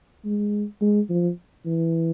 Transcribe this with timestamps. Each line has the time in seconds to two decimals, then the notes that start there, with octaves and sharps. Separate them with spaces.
0.25 G#3
0.81 G#3
1.10 F3
1.66 E3